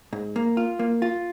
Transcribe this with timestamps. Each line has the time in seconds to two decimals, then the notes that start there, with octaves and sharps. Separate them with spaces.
0.13 G#2
0.36 A#3
0.57 F4
0.79 A#3
1.02 F4